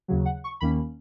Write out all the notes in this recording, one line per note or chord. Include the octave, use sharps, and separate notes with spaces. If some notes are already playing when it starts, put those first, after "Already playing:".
D#2 C#3 F#3
F#5
C#6
D#2 D#3 A#3 C#4 B5